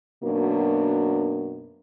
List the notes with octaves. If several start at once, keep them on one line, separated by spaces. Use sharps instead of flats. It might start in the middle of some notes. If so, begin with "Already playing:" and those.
F#2 B2 A#3 D4